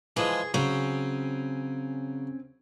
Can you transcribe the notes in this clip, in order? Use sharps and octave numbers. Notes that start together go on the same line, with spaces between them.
E3 F3 G#3 G#4
C#3 F#3 C4 C#4